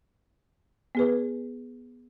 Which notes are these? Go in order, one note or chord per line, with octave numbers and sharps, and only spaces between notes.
B3 G#4 B4